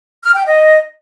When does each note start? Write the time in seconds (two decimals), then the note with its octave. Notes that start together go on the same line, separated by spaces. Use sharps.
0.23 F6
0.34 G5
0.46 D#5